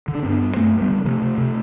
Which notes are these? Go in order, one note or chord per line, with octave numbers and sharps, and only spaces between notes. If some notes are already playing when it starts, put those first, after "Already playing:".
D3
D4
G2 C4
B3 D4
G2
G2 A3 C4
G2
G3 B3
D3
C3 F3 A3
C3
C3